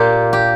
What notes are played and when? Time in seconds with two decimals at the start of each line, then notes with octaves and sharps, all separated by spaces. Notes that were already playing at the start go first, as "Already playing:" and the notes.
Already playing: A#2 A#3 F4 G4
0.33 G4